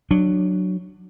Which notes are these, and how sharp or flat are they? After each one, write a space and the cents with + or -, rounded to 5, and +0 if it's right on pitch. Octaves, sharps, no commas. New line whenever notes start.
F#3 +0 D4 +20